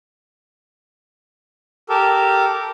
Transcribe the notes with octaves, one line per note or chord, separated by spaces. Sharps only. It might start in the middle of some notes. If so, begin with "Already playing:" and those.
G4 A4 A#4